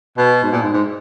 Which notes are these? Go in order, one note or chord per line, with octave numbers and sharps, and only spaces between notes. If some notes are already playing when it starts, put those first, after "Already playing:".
B2
G#2
A#2
G#2
G#2